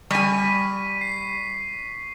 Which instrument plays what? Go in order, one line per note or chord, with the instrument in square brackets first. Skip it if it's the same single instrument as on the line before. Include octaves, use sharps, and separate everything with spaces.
[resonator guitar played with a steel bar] G3 G#5 [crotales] C#6 B6 D#7
[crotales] C7